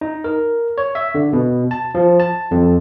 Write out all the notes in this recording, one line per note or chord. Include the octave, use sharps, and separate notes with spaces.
D#4
A#4
C#5
E5
D3
B2
A5
F3
A5
F2